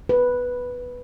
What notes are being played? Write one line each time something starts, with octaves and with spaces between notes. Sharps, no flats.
B4